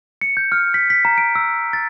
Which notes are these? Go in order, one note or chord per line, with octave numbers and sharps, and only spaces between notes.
C#7
G6
F6
B6
B6
A#5
D7
E6
A6